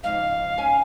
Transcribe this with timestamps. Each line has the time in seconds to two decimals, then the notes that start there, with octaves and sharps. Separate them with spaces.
0.04 F2 G#2 C#3 F5
0.58 C#4 G#5